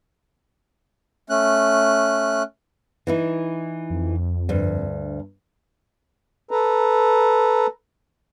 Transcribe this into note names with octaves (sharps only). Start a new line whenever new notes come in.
A3 C#4 F#6
E3 D#4 E4
F2
D2 G2
A4 B4 A#5